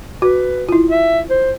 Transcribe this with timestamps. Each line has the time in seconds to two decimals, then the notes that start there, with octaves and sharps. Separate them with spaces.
0.22 F#4 B4
0.69 E4 F4
0.90 E5
1.30 C5